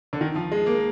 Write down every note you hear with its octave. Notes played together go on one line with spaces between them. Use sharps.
D3
D#3
F3
G#3
A#3